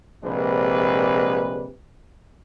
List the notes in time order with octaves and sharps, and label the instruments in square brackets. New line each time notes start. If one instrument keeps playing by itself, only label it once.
[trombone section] A#1 C3 G#3 D4 B4